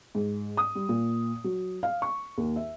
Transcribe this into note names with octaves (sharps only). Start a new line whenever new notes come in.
G#2
D#6
G3
A#2
F#3
F5
C#6
D#2
E5